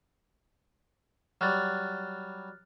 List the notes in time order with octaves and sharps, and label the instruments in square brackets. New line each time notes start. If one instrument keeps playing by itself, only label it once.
[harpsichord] F#3 G3 [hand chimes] F6 F#6 A6